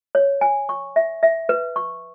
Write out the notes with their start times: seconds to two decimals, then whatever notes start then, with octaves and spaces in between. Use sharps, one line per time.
0.15 C#5
0.41 G#5
0.69 C#6
0.96 E5
1.23 E5
1.49 B4
1.76 C#6